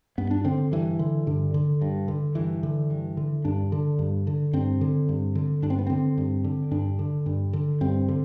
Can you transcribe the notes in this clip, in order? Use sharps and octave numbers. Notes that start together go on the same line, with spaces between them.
G2 B3
D4
D3 C4
G2 E3
D3
G2 D3
D3
G2
D3
G2 E3
D3
G2
D3
G2 D4
D3
G2
D3
G2 C4
D3
G2
D3
G2 D4
C4
B3
D3 C4
G2
D3
G2 D4
D3
G2
D3
G2 C4
D3